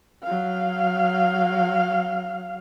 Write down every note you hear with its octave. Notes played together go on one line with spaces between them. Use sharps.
F#3 F5